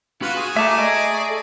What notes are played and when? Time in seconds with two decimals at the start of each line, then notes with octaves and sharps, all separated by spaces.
0.22 F4 F#4 B4
0.36 G#4 G#5
0.57 A3 E5 A5 A#5 D6
0.78 D5 D#5
1.13 C#6
1.28 A4